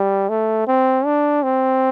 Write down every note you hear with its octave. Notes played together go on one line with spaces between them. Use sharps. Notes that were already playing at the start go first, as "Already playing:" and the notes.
Already playing: G3
A3
C4
D4
C4